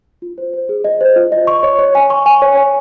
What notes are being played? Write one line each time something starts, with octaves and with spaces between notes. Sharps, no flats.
F4
C5
C5
G#4
D#5
C5
F4
D#5
C#6
C#5
C#5
G#5
C#6
G#5
C#5
G#5